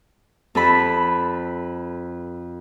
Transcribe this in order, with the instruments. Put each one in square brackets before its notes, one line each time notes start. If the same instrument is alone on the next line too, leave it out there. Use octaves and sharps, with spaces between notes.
[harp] F2 A4 B5